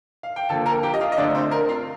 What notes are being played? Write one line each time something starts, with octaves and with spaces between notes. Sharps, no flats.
F5
G5
D3 F3 A#3 A4 A5
A#4 A#5
G4 G5
D#5
F4 F5
D#5
D3 A3 C4 D4 D5
C4 C5
A#4
F4 F5